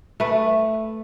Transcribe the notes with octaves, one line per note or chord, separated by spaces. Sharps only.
A3 B4